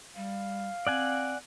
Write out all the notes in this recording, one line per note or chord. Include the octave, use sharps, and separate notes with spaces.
G3 F5
C4 D5 F#5 G#5